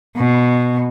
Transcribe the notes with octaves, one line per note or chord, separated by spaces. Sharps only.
B2